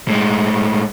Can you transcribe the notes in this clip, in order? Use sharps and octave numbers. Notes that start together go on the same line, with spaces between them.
A2 G#3